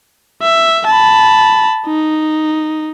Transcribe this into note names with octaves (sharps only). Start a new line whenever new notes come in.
E5
A5 B5
D#4